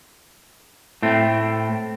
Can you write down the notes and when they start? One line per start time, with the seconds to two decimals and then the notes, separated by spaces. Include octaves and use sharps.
1.02 A2 A3 C4